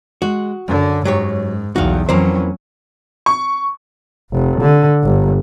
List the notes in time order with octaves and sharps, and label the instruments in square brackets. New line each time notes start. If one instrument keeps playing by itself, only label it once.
[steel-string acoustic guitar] G#3 [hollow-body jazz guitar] F#4
[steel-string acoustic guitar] F#2 [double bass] D3
[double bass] G#2 [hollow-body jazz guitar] F#3 G4 C#5
[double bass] B1 E2 [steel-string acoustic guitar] G3 D#4 [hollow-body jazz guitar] F#4 F5
[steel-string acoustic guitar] F2 E3 A#5 [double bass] F#3 C#4 [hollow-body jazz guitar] A#3 C5
[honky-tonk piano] C#6
[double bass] F1
D3
G1